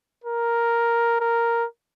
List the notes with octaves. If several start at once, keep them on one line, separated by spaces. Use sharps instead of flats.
A#4
A#4